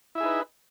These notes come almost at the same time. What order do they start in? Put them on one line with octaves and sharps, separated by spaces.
E4 E5 G#4 D#4 B4